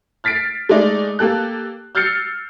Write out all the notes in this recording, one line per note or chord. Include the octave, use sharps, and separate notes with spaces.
F6 A6 B6 C7 D7
G#3 A3 D#4 D5
A#3 G4 A4 F#6
E6 F6 G6 A6 C7 C#7